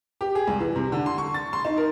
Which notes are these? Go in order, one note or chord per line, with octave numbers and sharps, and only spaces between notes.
G4
G#4
C2
E3
C3
D3
C6
C#6
A6
C6
D#4
A#4